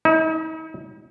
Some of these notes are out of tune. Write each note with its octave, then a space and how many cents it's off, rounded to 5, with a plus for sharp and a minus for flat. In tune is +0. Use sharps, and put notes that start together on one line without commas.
D#4 +45